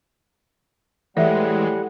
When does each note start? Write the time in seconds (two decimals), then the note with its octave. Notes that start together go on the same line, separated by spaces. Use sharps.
1.17 A2 E3 G3 G#3 D5 E5 F#5